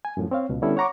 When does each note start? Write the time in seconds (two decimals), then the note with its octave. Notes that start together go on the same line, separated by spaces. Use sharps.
0.05 G#5
0.17 F#2 A2 F3
0.31 C4 C#5 F5
0.49 C#2 B2
0.62 D3 G3 B3 C#4 E4 A4
0.77 C#5 F#5 A#5 C#6 D6